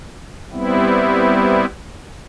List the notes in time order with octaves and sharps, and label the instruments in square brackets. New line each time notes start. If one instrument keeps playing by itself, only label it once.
[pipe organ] G3 B3 C4 E4